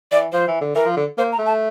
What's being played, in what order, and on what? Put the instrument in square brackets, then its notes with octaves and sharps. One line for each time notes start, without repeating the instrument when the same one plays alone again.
[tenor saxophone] E3 [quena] D5
[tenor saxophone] F3 [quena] C5
[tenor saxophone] E3
D3
[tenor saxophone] E3 [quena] A#4
[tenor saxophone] F3
D3
[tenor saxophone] A#3 [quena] C5
[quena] A#5
[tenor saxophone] A3
[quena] A5